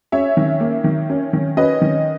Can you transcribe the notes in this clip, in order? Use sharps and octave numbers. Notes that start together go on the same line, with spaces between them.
C#4 C#5 E5
D#3
A#3
D#3
C#4
D#3
C#4 B4 D#5
D#3